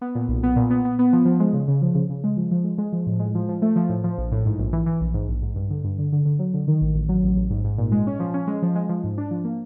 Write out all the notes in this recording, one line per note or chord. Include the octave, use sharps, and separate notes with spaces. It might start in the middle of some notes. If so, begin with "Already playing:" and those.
B3
A#2
B1
B3
A#2
B3
B3
B3
F3
F3
G#3
C#3
C#3
F3
C#3
C#3
G#3
F3
F3
G#3
G#3
F3
A2
G#3
F3
F3
A3
F3
A2
F3
A#1
A2
G#2
A#1
E3
E3
A#1
G#2
A#1
G#2
G2
D3
G2
D3
D3
D3
F#3
D3
D#3
A1
A1
F#3
A1
A1
G#2
G#2
A#2
G#3
C#4
F3
C#4
G#3
F3
G#3
F3
G#2
D4
F3
A#3